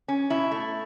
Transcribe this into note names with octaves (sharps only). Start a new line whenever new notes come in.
C#4
B2 E4
A3